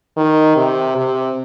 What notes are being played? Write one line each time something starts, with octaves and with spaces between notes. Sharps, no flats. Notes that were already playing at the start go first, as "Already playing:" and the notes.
D#3
C3
C3